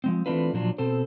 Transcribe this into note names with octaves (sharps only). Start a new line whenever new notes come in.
F3 G#3 C4
E3 A3 C4 D4 F4 B4
A#2 F3 F#3 D4 F4
B2 C4 A4 C5